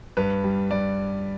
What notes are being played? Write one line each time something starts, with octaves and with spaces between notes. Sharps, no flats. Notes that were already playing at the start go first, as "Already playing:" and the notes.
G2 B4
G3
G2 D5